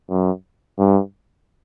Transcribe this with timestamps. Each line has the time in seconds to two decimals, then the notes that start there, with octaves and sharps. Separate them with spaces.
0.10 F#2
0.79 G2